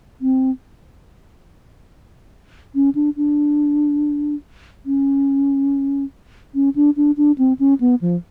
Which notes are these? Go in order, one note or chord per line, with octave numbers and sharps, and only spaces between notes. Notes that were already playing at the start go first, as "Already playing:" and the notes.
C4
C#4
D4
D4
C#4
C#4
D4
D4
D4
C4
C#4
B3
F3